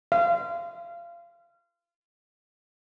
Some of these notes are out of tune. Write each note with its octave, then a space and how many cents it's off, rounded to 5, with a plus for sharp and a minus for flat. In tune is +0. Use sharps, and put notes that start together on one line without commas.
F5 -25